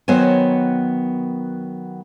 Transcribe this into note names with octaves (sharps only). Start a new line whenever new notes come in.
D#3 F#3 B3 C5 C#5 G#5